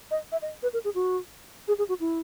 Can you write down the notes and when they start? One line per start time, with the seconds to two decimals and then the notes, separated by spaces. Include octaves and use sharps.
0.11 D#5
0.32 E5
0.42 D#5
0.63 B4
0.73 A#4
0.84 G#4
0.95 F#4
1.68 G#4
1.78 G#4
1.89 F#4
2.00 E4